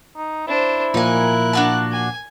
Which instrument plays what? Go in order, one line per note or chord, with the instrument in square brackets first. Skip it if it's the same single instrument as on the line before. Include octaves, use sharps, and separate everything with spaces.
[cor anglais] D#4
[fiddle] D4 C5 [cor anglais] E4
[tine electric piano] A#2 F3 A#3 [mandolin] D#4 G#5 [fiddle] A#4 F#6
[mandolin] D4 F#4 A5
[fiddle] G#5